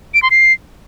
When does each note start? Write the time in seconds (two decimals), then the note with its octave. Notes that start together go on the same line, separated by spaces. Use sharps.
0.14 D7
0.22 C6
0.31 C7